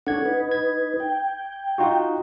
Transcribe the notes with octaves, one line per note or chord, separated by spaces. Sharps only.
C#4 D4 A4 F#5 G#6
D#4 B4
G#6
G5
D#4 F4 F#4